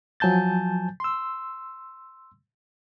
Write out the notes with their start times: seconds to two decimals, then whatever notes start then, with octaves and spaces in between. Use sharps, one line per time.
0.20 F3 F#3 G#5 A5 G6 A6
1.00 C6 E6